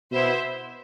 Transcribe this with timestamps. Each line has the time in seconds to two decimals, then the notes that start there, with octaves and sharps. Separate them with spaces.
0.12 B2 B3 E4 C5 E5